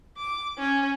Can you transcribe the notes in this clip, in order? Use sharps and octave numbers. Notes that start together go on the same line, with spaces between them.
D6
C#4